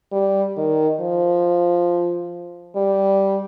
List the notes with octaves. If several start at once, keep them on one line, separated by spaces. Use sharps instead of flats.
G3
D#3
F3
G3